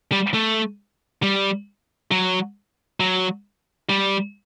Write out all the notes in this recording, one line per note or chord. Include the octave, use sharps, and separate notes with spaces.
G3
A3
G3
F#3
F#3
G3